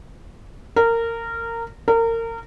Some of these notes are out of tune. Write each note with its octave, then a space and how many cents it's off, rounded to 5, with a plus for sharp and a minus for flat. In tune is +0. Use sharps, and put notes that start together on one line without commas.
A#4 -20
A#4 -30